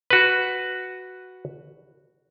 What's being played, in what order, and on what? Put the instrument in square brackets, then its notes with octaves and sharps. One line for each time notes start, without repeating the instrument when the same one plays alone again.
[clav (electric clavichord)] F#4 B4